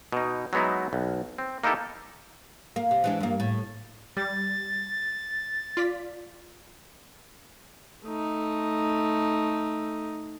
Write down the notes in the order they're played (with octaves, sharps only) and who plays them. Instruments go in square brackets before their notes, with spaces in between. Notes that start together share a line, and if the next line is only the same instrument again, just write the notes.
[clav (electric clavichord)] B2 D#4
F#3 G#3 B3 D#4 E4
B1
C4
A#3 D#4 E4 G4 A4
[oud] A#3
C3
E3 G#3 D4
G2 A#3
A2
[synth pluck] G3 [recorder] A6
[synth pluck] F4 D5 B6
[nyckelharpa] A3 D#4